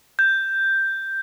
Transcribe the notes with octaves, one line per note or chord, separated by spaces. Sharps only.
G6